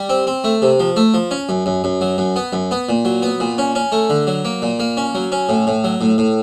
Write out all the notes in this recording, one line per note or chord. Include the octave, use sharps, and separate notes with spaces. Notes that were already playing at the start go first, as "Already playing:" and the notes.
Already playing: G3
C4
C4
A3
C3
F3
A3
F3
C#4
F#2
F#2
F#2
F#3
F#2
B3
F#2
B3
A#2
F#3
B3
A#2
C#4
C#4
A3
D3
F#3
A#3
A#2
A#3
C#4
F#3
C#4
A2
A2
F#3
A2
A2